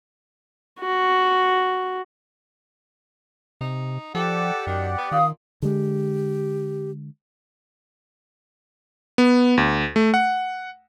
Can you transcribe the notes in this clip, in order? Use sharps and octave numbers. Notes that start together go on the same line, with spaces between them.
F#4
C3 D#4
F3 G4 A4 D5 F#5
F#2 D#3
B3
A#2 D#3 F5 D#6
D3 G#3 G4
B3
D2
A3
F#5